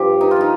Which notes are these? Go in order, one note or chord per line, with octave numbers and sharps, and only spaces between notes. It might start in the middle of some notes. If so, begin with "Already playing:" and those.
Already playing: G2 F3 G4
D#4
F4
F3 D#4